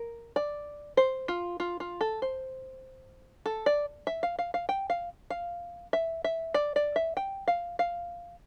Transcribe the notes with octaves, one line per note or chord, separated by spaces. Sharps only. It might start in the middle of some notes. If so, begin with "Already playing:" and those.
Already playing: A#4
D5
C5
F4
F4
F4
A4
C5
A4
D5
E5
F5
F5
F5
G5
F5
F5
E5
E5
D5
D5
E5
G5
F5
F5